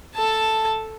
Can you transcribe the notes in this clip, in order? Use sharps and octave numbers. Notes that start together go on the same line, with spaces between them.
A4 A5